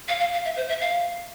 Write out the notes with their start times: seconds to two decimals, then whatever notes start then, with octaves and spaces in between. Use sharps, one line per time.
0.08 F5
0.20 F5
0.33 F5
0.45 E5
0.57 C5
0.69 E5
0.81 F5